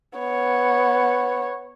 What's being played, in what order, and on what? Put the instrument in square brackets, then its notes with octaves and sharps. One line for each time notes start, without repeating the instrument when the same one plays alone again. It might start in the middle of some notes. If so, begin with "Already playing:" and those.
[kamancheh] B3 C#5